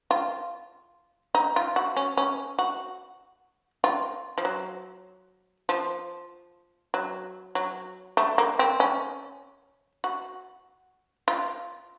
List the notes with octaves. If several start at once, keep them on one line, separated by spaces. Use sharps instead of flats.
F4
D#4
F4
F#4
C#4
C#4
F#4
F4
F3
F#3
F3
F#3
F#3
A3
A#3
C4
C#4
F#4
F4